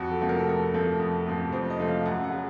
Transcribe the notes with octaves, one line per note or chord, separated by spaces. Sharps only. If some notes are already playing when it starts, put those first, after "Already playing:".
Already playing: F2 F#4
A4
C3 F3 A3
A#4
A4
F2 A#4
C3 F3 A3
F2
C3 F3 A3
F2 C5
D#5
C3 F3 A3
F5
F#2 F#5
F#5
C#3